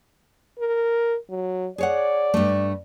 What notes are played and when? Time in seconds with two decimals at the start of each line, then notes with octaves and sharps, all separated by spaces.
0.59 A#4
1.30 F#3
1.78 G#4 C#5 D5 F#5
2.34 G2 A3